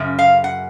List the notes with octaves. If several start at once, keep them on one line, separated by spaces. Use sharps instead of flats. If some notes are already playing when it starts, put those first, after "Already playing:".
Already playing: F#2 C#3
F5
F#5